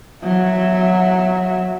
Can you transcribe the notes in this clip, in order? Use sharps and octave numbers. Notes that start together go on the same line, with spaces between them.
F#3 E5